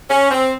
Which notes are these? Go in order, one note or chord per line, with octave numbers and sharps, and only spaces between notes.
C#4
C4